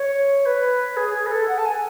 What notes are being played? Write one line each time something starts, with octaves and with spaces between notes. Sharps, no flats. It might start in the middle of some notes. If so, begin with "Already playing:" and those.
Already playing: C#5
B4
G#4
G#4
B4
A4
F#5
A5
G#5